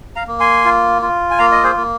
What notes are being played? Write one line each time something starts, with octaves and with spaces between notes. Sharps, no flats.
F5 A#5
A#3
G#5 C6
F4
F4
G#5
A#3 F5 A#5
D#5
G#4 C5
A#3